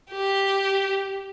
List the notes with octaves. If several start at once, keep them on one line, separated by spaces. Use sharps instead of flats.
G4